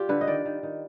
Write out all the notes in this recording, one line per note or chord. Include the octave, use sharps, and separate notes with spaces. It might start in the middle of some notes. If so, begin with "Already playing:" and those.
Already playing: G3 F4 G4
D3 B4
D#5
D#3 D5
D#3
D#3